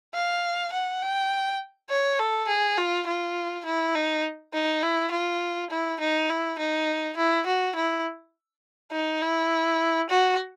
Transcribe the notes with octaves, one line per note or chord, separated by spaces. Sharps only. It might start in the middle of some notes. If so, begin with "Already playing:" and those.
F5
F#5
G5
C#5
A4
G#4
F4
F4
E4
D#4
D#4
E4
F4
E4
D#4
E4
D#4
E4
F#4
E4
D#4
E4
F#4